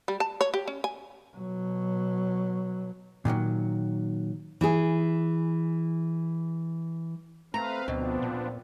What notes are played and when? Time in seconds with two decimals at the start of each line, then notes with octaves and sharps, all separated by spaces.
0.08 G3
0.20 A5
0.41 C#5
0.54 G4
0.68 C#4
0.84 G#5
1.37 B2 F#3
3.25 A#2 D#3 E3 F#3
4.61 E3 E4 G#4
7.54 A3 C4 B4 F5 A#5
7.88 D2 B2 F3 B3 D4
8.22 A#2